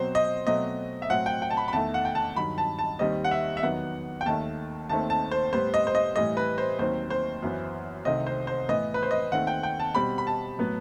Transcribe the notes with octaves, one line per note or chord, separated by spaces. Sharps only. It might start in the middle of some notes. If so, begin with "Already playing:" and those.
Already playing: B2 F#3 C4 C5
D#5
B2 F#3 A3 C4 D#5
E5
A2 F#3 C4 F#5
G5
G5
A5
B5
B5
E2 D#3 A3 A5
F#5
G5
A5
G2 D#3 F#3 B5
A5
A5
D#2 D#3 G3 C4 D#5
F#5
E5
E5
E2 D#3 F#3 B3 F#5
G5
D#2 D#3 A3 A5
D#2 D#3 A3 C4 A5
A5
C5
A2 G3 B3 C5
D#5
C5
D#5
A2 E3 G3 D#5
B4
C5
D#2 D#3 F#3 C4 C5
C5
F#2 E3 B3
C2 C3 D#3 A3 C4 D#5
C5
C5
A2 E3 B3 D#5
B4
C5
D#5
D#2 D#3 A3 C4 F#5
G5
G5
A5
B2 G3 C4 B5
B5
A5
A2 F#3 B3